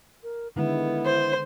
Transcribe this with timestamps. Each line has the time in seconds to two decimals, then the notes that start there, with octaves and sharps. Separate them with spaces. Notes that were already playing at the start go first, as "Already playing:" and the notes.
0.23 A#4
0.56 D3 D#3 G#3 B3 E4
1.06 C5